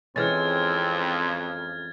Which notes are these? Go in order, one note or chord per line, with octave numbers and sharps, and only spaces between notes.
F2 E3 G#3 C4 C#4 F6 G#6 A6